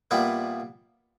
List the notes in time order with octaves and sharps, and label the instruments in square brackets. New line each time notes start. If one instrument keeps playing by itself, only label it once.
[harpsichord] A#2 G3 B3 E4